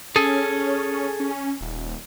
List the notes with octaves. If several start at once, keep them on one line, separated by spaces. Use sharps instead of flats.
C#4 G#4 A4
C#4
D#1